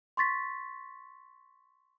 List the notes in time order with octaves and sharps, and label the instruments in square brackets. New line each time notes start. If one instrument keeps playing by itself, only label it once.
[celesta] C6 C#6 A6 B6